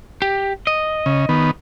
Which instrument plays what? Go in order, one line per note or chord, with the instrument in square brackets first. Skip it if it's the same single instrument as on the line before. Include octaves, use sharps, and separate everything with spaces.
[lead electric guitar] G4
D#5
[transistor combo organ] C#3
D#3 B3